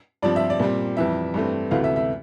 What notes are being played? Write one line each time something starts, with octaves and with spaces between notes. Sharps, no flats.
G2 F3 C4 D5
E5
D5
A#2 G3 C4
F2 E3 G3 E5
G2 E3 A3 C4
D2 C3 E3 A3 F5
E5
E5